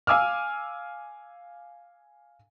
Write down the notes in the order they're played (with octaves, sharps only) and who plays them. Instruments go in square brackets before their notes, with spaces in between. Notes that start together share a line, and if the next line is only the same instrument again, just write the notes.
[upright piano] F5 G#5 D6 E6 F6